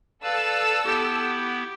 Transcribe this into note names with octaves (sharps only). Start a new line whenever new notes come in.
A4 B4 D5 F5 E6
B3 E4 G4